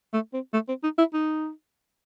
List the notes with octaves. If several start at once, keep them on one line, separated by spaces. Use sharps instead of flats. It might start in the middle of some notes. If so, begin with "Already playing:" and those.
A3
C4
A3
C4
D#4
E4
D#4